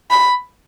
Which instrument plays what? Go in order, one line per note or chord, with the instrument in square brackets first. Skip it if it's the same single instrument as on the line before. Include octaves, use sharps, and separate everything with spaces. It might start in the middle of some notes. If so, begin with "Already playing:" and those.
[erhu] B5